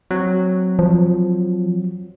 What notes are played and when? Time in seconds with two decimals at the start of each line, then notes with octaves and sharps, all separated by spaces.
0.11 F#3 C4
0.79 F3